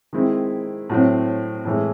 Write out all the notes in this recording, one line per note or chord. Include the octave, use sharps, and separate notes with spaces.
D#3 G#3 C4 E4
A2 F#3 C4
A2 E3 G#3